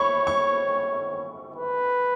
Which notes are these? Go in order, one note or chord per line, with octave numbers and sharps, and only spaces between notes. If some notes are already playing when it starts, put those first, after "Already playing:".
Already playing: C#5 B5 C#6
C#6
B4